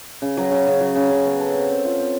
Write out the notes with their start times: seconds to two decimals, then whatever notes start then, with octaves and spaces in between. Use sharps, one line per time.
0.22 C#3
0.37 F#3
0.51 C#3
0.67 C#3
0.81 F#3
0.96 C#3
1.11 C#3
1.25 B3
1.40 A4
1.54 C4
1.70 C4
1.85 F4
1.99 C4